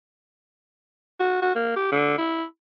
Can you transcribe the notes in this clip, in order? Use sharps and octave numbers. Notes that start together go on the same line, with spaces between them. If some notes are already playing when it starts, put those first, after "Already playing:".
F#4
F#4
A#3
G4
D3
E4